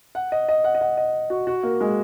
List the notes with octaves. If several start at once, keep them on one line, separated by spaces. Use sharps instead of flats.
F#5
D#5
D#5
F#5
D#5
F#5
D#5
F#4
F#4
A#3
G#3